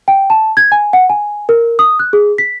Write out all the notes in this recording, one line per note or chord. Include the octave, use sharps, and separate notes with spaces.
G5
A5
G#6
G#5
F#5
G#5
A#4
D#6
F#6
G#4
B6